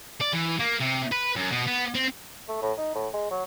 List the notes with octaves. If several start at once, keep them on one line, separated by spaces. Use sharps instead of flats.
D5
E3
A#3
C3
B4
F#2
B2
B3
C4
A3
A2
D#4
A2
G#3
F#3